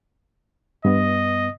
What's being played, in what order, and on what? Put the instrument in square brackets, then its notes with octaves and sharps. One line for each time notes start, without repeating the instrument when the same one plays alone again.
[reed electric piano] G2 B3 [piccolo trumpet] D#5